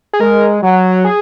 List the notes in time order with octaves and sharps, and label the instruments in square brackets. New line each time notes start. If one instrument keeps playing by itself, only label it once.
[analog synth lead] G#4
[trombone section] G#3 [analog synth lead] A#4
[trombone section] F#3
[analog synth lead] G#4